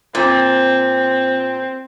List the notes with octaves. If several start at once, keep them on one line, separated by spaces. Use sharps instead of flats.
A#2 C4